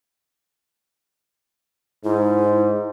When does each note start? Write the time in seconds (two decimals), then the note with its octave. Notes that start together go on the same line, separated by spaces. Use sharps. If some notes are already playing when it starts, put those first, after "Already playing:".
2.05 G#2 E4